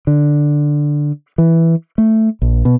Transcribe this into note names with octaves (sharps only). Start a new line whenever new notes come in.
D3
E3
A3
A#1
B2